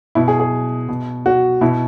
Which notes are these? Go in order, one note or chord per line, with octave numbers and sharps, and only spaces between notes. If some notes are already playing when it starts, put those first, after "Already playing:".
B2 E4
G#4
G#4
B2
F#4
B2 E4